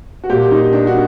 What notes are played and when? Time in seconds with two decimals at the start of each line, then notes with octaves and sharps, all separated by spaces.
0.24 F#4
0.30 A#2 G4
0.51 D#4
0.73 D4
0.87 F#4